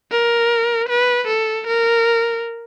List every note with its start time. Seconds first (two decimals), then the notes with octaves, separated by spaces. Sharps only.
0.11 A#4
0.89 B4
1.28 A4
1.67 A#4